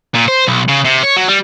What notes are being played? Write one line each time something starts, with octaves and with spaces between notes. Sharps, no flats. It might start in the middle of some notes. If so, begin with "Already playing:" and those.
A#2
C5
B1
C#3
C3
C#5
F#3
G3